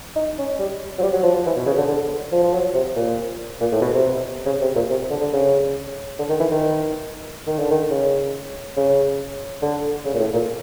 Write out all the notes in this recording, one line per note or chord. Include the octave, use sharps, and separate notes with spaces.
D#4
C#4
G3
F#3
G3
F#3
F3
F3
E3
B2
C#3
D3
D3
F3
F3
F#3
C3
A#2
A#2
A2
B2
C3
C#3
C3
A#2
C3
D3
D3
C#3
D3
D#3
E3
D#3
D#3
D3
D#3
C#3
C#3
D3
C#3
A#2
A2
A#2